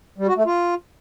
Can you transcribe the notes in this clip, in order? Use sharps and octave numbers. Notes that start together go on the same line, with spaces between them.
G3
F#4
A3
F4